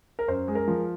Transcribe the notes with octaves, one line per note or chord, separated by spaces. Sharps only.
A#4
F#2 C5
G#3
A#4
F3